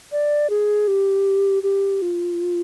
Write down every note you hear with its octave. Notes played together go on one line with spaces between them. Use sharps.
D5
G#4
G4
G4
F4